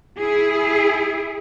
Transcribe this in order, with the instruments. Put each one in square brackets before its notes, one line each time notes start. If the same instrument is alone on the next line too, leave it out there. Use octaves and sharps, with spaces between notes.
[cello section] E4 G#4